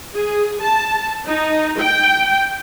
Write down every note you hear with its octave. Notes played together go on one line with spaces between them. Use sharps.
G#4
A5
D#4
G5